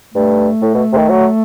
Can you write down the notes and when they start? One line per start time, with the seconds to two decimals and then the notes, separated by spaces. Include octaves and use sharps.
0.14 G2 A3
0.62 A2
0.74 B2
0.92 C3
0.97 D#3
1.09 F#3